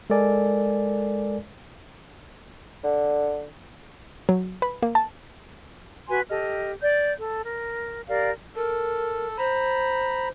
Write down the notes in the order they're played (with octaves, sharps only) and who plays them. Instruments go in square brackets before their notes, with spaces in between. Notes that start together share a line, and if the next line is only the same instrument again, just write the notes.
[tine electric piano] G#3 A4 A#4 D5 G#5
[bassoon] D3
[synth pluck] F#3
B4
A#3
A5
[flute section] F#4 B4 G#5 C6
G4 A4 D#5 F6
D5 G6
A4
A#4
G4 A#4 D5 F5
[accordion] A4 [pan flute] A#4
[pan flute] C5 [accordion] A#5 B5